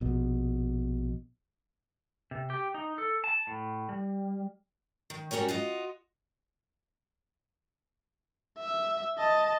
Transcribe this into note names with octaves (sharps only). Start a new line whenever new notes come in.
A#1 B2
C3
G4
D#4
A4
A5
A2
G3
D#3
G3 C#4 F#4 A#4 C#5
F4 F#4 D#5
E5
D#5 A5